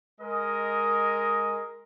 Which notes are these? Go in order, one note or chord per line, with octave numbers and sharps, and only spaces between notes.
G#3 A#4 D#5 D#6